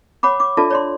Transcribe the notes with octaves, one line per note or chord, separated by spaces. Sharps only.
C#5 F#5 B5 D6
D6
D4 F4 A4 D5 E5 A5
C#5 D5 C6